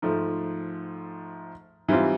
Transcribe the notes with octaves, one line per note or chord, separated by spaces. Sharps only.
G#2 F3 A3
G#2 E3 G3 C4 F4